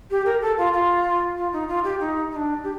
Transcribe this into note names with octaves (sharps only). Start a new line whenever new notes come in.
G4
A#4
A4
F4
F4
F4
D#4
F4
G4
D#4
D#4
D4
G4